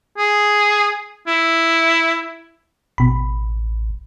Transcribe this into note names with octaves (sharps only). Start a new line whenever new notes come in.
G#4
E4
A1 B2 B5